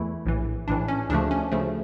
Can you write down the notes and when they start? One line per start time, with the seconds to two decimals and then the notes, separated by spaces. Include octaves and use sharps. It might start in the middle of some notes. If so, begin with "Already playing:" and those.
Already playing: E2 E3 A3 E4
0.26 A#1 A2 E3
0.68 A#1 A2 E3 D4
0.88 C#4
1.09 D2 C#3 F3 A3 D4
1.31 C#4
1.52 D2 C#3 F3 A3